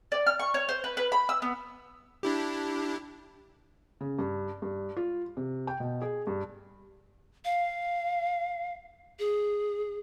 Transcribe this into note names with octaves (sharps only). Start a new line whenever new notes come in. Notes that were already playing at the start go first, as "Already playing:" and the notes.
D5
F6
C#6
C#5
C5
B4
B4
B5
E6
B3
D4 E4 G4
C#3
G2
G2
F4
C3
G5
B2
G#4
G2
F5
G#4